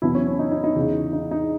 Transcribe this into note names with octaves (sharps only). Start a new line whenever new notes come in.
E2 B2 F#3 E4
C#4
C#4
D#4
D#4
D#4
E2 C#3 E3
D#4
D#4